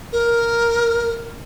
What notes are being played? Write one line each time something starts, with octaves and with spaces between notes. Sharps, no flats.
A#4